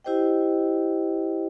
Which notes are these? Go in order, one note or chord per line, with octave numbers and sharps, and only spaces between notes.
E4 G4 C5 D#5 G5